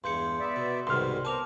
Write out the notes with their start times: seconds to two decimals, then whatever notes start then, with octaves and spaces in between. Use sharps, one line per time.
0.04 E2 G2 G#3 C6 G6 C#7
0.40 B3 D5 E5
0.56 B2
0.87 C2 G#2 B2 D#3 G3 C6 F6
1.25 B3 C4 A#4 A5 D6 F7